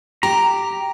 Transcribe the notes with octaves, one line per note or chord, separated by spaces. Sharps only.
G4 A#5